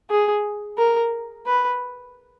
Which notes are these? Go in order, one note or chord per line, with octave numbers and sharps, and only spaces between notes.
G#4
A#4
B4